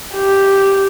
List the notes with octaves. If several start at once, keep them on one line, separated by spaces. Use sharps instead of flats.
G4